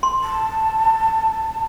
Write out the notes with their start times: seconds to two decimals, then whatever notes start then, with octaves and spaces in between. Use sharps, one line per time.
0.03 C6
0.24 A5